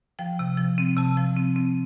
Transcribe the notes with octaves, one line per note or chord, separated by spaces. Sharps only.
F3 G5
C3
F3
C4
C3 A5
F3
C4
C4